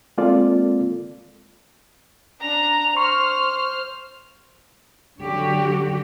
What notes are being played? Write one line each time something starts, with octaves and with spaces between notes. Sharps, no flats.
G#3 A#3 C4 F4 A4 D5
D4 A#5 F7
C5 C6 C#6 F6
D3 F#3 F#4 G4